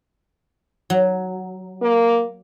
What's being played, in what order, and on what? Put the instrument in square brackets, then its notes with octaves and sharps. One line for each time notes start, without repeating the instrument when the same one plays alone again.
[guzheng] F#3
[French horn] A#3